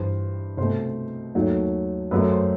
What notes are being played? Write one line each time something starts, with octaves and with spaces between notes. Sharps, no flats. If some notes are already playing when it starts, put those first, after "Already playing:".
Already playing: G2 E3 G3 C5
C2 B2 A3 C5
D#2 D#3 F#3 A3
F#2 F#3 A3 B4
C5